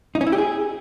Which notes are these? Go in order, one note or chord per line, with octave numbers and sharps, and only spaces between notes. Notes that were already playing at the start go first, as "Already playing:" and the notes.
D#4
C#4
E4
G4
G#4